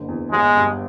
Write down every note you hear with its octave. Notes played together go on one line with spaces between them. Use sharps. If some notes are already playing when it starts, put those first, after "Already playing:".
Already playing: F#1 D3
E2
G1 G#3
G2